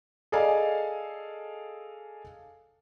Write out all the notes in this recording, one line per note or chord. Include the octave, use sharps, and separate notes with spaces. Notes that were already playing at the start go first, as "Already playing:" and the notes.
G#4 A4 D5 D#5 F5 G#5